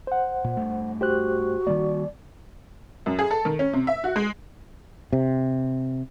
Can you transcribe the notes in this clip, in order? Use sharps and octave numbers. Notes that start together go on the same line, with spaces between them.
C5 F#5
A#2
G2 A3
F#4 G4 C5 F#6
D#3 G3 A#3 D5
F#2
G#4
A4
D#3
C#4
C3
E5
F#4
G#3
C3